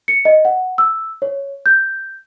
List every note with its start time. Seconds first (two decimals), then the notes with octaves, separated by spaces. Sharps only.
0.08 C#7
0.25 D#5
0.45 F#5
0.78 E6
1.22 C#5
1.66 G6